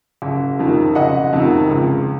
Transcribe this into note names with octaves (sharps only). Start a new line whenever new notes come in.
F#1
F2 C3 D#3
F#1 D#5 F#5
F2 C3 D#3
C#2